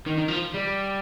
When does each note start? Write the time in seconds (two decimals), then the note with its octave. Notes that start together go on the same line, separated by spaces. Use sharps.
0.07 D#3
0.18 D#3
0.28 F3
0.54 G3